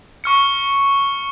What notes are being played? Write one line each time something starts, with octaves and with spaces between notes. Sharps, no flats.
C#6 F6 C#7